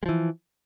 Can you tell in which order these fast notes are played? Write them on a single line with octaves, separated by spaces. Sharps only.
G#3 F3 E3